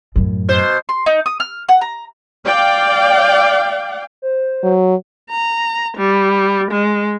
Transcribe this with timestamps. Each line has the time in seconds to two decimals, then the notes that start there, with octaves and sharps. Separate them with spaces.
0.16 F#2 A2
0.49 B2 C5
0.89 C6
1.06 D#4
1.26 D#6
1.40 F6
1.69 F#5
1.81 A#5
2.47 D5 F5 G5
4.22 C5
4.63 F#3
5.30 A#5
5.97 G3
6.71 G#3